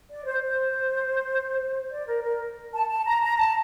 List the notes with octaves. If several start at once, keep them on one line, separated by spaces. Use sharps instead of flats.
D5
C5
C5
D5
A#4
A#4
A5
A5
A#5
A#5
A5